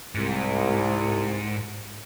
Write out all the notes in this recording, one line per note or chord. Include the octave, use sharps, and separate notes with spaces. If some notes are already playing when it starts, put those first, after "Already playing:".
C2 G#2